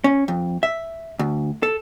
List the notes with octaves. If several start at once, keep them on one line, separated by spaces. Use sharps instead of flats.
C#4
F2
E5
D2
A4